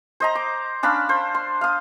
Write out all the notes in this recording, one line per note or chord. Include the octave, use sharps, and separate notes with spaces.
C5 D#5 A#5
D6
C#4 D4 F5 B5
C5
C6
F5 D#6